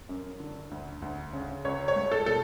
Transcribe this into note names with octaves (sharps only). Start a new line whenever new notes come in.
F#2
D3
D2
D2
C#3
C#2 C#5
C#5
A3
A4
B2 A4